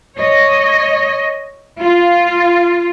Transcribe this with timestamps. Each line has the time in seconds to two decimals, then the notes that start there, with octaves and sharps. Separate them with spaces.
0.16 C#5 D#5
1.80 F4